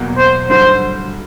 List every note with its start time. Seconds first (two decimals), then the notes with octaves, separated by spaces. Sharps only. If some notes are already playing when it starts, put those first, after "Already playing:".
Already playing: E2 B2 F#3 A#3
0.17 C5
0.50 G2 D3 F#3 C5